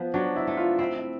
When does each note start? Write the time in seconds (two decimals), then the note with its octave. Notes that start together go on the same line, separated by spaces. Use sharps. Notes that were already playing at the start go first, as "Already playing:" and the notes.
Already playing: F3 B3
0.14 F#3 D4
0.36 E4
0.47 A3
0.57 F4
0.79 C4 E4
0.95 E4